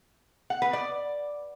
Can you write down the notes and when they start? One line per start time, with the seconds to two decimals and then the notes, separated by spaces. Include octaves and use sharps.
0.50 F#5
0.62 B4
0.73 D5